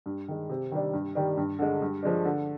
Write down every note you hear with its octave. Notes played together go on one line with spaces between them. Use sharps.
G2
D#3 G#3
C3
D#3 G3 D4
G2
D#3 G3 D4 G4
G2
D3 G#3
G2
F3 G#3 D4
D3